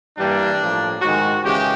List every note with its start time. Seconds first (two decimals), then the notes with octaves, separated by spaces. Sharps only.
0.17 G2 E3 G3 A#3 D4
0.59 A2 F3 A#3
1.01 G#2 D#3 G#3 F#4
1.43 C#3 E3 G#3 G4